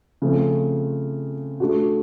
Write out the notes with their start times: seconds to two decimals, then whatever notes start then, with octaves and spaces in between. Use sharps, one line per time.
0.22 C#3 F3 A3 C4
1.60 A3 D4 F#4